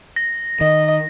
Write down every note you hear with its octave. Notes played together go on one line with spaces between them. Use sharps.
A#6
D#3 D#5